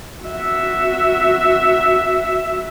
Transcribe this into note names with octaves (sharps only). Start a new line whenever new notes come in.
F#4 E5